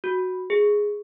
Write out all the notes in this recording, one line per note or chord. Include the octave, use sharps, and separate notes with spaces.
F#4
G#4